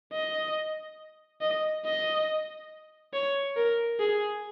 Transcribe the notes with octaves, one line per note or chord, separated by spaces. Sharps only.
D#5
D#5
D#5
C#5
A#4
G#4